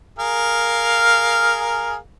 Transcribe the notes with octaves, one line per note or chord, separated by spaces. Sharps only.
G#4 A#4 F5